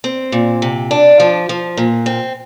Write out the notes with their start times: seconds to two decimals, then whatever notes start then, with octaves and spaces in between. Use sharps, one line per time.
0.04 C4
0.32 A#2
0.62 C3
0.91 D4
1.20 F3
1.49 F3
1.77 A#2
2.06 C4